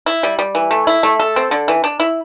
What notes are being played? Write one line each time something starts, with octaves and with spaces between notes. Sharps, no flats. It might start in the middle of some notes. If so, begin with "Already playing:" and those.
E4
G3
G3
E3
A3
E4
A3
A4
C4
D3
E3
D4
E4